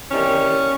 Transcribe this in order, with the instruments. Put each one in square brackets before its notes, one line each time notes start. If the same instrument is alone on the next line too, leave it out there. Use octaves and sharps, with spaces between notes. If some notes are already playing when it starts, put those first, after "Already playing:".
[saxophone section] E2 C3 D#3 G3 A#3 C#4